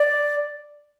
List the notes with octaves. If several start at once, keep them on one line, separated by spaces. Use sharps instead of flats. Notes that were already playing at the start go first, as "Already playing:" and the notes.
Already playing: D5